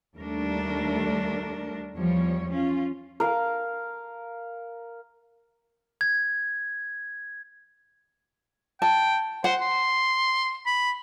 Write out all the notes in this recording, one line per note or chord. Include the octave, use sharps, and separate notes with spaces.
D#2 G3 A3 D4 A#4
E2 F3 G3 C#5
C#4 F4
A#4 F5
G#6
G5 A5
C5 F#5
C6
B5